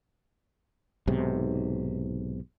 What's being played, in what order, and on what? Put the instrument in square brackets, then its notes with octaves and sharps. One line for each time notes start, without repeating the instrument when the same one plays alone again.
[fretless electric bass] B1 G#2 C3